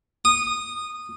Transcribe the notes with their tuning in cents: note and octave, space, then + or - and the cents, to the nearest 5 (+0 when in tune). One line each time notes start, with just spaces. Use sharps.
D#6 -15